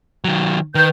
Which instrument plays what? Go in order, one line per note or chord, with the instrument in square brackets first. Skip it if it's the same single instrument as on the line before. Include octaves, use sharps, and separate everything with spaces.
[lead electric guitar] D#3 F#3
[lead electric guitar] D#3 [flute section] B4 G6